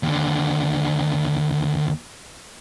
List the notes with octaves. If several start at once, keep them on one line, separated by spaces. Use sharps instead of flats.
D#2 D3